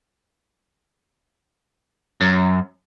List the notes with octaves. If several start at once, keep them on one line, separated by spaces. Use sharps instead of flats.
F#2